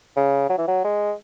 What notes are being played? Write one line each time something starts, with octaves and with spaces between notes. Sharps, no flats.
C#3
F#3
E3
F#3
G#3